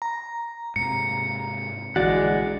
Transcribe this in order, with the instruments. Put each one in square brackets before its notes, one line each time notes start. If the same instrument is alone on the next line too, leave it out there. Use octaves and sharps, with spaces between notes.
[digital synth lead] A#5
[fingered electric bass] G#2 C3 [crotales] C#7
[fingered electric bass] A#1 D3 E3 [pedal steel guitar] G#3 D5 F#5 [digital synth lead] F#4